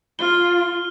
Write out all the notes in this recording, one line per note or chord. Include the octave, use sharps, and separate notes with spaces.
F4 F6 G7